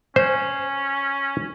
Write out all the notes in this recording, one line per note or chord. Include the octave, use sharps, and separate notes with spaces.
C#4 C5